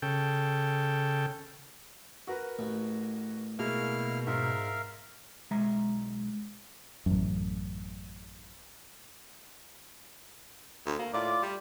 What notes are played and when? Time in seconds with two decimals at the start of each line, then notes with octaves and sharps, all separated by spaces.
0.02 C#3 A4 G5
2.27 F#4 A#4 B4
2.59 A1
3.59 B2 G#3 A#3 E4 F5 F6
4.27 G#2 A#4 E5 F5
5.50 B1 G#3 E5 A#5
7.06 A1 F#2
10.86 D2
10.99 A#3
11.14 A2 F4 D5 D6
11.42 G3